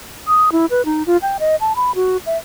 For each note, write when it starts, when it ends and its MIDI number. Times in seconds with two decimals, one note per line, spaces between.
0.28 0.49 87
0.52 0.66 64
0.70 0.85 71
0.85 1.03 63
1.06 1.17 65
1.22 1.37 79
1.40 1.56 75
1.61 1.73 81
1.76 1.92 83
1.95 2.17 66
2.26 2.37 76